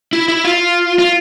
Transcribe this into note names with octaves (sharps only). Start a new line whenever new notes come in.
E4
E4
F4
F4